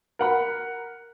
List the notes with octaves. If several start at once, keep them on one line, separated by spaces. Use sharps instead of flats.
A#4 F#5 B5